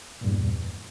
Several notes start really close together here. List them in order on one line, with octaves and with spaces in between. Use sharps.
A#2 G2 E2